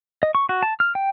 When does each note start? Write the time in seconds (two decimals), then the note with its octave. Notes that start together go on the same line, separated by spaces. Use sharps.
0.23 D#5
0.35 C#6
0.49 F#4
0.63 A5
0.80 F6
0.95 G5